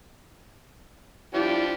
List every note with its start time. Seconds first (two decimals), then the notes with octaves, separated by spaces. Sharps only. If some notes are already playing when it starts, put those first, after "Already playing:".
1.34 F3 D4 E4 G4